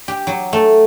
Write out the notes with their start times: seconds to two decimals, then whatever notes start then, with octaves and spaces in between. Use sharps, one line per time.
0.08 G4
0.27 F#3
0.53 A3